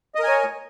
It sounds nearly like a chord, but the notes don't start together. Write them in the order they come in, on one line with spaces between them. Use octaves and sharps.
D#5 A#4 G#5 C#5